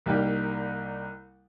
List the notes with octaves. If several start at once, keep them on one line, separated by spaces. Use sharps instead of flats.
C2 G3 A#3 D#4 G4 G5